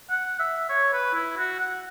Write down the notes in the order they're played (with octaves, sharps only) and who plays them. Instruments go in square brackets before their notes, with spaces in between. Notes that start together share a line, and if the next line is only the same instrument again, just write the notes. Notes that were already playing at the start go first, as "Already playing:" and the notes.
[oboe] F#5
E5
C#5
B4
E4
F#4
F#5